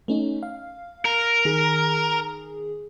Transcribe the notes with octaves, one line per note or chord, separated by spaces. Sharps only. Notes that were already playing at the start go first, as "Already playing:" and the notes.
A3 C#4 D#4
F5
A#4
D#3 G#4